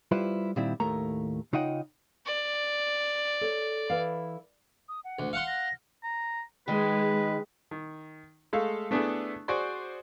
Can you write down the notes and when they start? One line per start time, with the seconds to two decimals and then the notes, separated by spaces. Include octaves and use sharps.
0.12 G3 E4 F4 B4 C5
0.56 A#2 D#3 G3 C4 E4
0.80 D#2 A2 A3 A#4 A#5
1.53 C#3 D#4 F4 D#5 F#5 G5
2.26 D5
3.41 A4 C#5
3.90 E3 E4 F5
4.89 D#6
5.04 F#5
5.19 D2
5.33 F5 F#5 C6 C#7
5.47 A#6
6.04 A#5
6.68 D#3 G#3 D#4 B4
7.71 D#3
8.53 G#3 A3 A4 F5
8.91 A3 B3 D4 E4 G#4 A4
9.48 F#4 G#4 C5 D5 C6